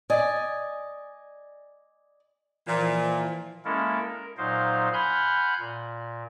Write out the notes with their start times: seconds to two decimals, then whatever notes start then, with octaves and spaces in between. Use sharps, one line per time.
0.10 D5 D#5 G#5
2.66 A#2 E3 F3
3.65 G#3 A#3 C#4 E4 A4 A#4
4.01 A#4
4.38 A#2 F#3 D#4 C5 F5
4.94 F#5 G#5 B5 C6 F6 G6
5.59 A#2